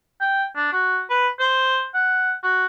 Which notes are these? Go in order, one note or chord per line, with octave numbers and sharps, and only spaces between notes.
G5
D4
F#4
B4
C5
F#5
F#4